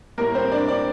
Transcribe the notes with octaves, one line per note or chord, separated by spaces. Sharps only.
A2 G3 A#3 A#4
C4 C5
D4 D5
D4 D5